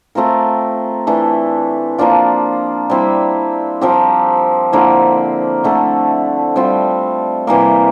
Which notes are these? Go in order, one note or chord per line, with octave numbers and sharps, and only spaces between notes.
A3 C4 F4 A#4
E3 A3 D4
F3 A#3 D4 F4
G3 C4 E4
F3 C4 G4 A#4
D3 F3 A#3 E4
D3 A3 D4
G3 C4 F4
C3 E3 G3 A#3